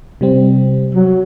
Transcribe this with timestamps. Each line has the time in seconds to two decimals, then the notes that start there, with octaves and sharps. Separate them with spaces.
0.21 C3 G3 C4
0.95 F#3